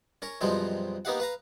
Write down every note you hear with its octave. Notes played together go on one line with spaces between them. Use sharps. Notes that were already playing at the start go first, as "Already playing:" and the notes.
C#4 A#4 C#5
F#2 B2 F3 G3 G#3 C4
A#3 B3 D#4 G4 F5 F#5
B4 F5 A#5